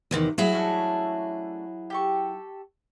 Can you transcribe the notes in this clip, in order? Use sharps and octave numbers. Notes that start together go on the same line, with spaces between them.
E2 C3 D#3
F#3 E4 G#4
A3 C#4 D4
G4 A4 C#6